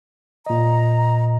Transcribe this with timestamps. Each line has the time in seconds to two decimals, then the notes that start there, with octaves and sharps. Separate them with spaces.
0.46 A#2 D#5 A#5